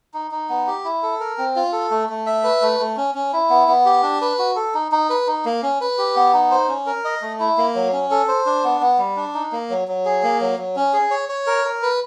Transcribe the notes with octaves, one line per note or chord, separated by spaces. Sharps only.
D#4
D#4
B3
G4
E4
A4
A#4
C4
F4
A4
A3
A3
E5
B4
A3
A3
C#4
C#4
E4
B3
B3
G4
D4
B4
F#4
A4
D#4
D#4
B4
D#4
A#3
C#4
B4
G4
B3
D#4
C5
C#4
A#4
D#5
A3
E4
A#3
F#3
C#4
A4
C5
D4
B3
B3
G3
D4
D#4
A#3
F#3
F#3
G#4
A#3
F#3
F#3
C#4
G#4
C#5
C#5
A#4
A#4
B4